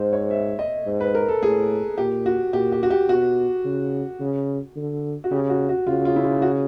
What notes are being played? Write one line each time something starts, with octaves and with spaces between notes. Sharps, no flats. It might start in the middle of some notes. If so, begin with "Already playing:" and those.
Already playing: G#2 C5
C#5
E5
D#5
G#2
B4
A#4
A4
A2 G#4
A#2 G4
F#4
A#2 G4
G4
F#4
G4
B2 F#4
C#3
C#3
D3
F#4
C#3 G4
F#4
F#4
C#3 F4
F4
E4
F4
F#4